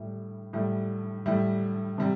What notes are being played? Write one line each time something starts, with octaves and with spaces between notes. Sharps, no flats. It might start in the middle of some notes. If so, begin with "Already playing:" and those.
Already playing: A2 G3 E4
A2 G3 E4
A2 G3 E4
C3 G3